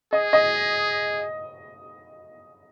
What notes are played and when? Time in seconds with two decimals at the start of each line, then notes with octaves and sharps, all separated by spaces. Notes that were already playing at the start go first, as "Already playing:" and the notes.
0.13 G#4 D#5
0.33 D#5